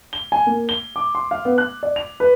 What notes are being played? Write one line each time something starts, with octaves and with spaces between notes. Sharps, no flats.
G7
G#5
A#3
G7
D6
C6
F5
B3
F#6
D5
F7
B4